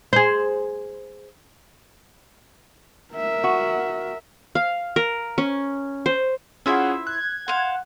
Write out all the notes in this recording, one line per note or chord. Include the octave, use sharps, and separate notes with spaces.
G#4 C5
A#4 E5
F#4
F5
A#4
C#4
C5
C#4 E4 F4 G#4 C5 E5 F#5
F#6 G#6
C5 F5 F#5